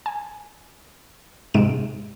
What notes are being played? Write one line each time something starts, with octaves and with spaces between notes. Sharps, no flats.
G#5
G#2 C3 G#3 D7 E7